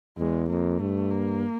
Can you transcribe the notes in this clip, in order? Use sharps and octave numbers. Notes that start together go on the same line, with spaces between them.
E2 G#3
F2 A#3
G2 A3
A#3